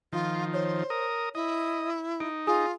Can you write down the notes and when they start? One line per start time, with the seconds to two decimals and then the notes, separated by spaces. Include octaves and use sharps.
0.13 D#3 F3 F4
0.54 C5 C#5
0.90 A#4 D#6
1.35 E4 D#5
2.20 D#4 D7
2.47 F4 G#4 G#5 D#6